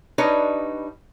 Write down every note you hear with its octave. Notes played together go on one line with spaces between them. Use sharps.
G3 D4 D#4 B4 C#5 D#5